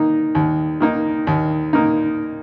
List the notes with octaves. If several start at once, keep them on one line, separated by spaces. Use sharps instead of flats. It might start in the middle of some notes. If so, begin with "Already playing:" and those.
Already playing: D#3 A#3 D#4
D#2
D#3 A#3 D#4
D#2
D#3 A#3 D#4